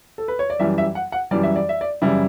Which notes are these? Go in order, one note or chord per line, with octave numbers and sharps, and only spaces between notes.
A4
B4
C#5
D5
F#2 E3 G3 E5
E5
F#5
F#5
F#2 E3 G3 D5
E5
D5
E5
D5
F#2 C#3 E3 G3 E4